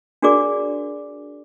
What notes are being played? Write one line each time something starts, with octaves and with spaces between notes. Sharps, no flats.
D4 F#4 G#4 A#4 D5 D6